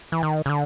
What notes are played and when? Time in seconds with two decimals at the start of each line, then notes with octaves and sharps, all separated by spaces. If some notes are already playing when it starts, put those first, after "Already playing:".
0.12 E3
0.23 D#3
0.46 C#3
0.49 D3